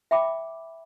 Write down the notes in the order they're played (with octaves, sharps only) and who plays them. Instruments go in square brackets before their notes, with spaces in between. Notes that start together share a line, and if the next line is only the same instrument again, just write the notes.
[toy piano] E5 G5 B5 D6